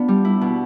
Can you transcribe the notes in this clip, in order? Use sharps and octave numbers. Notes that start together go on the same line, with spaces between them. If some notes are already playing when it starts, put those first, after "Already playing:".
Already playing: B3 D4 F4
G3
E4
B2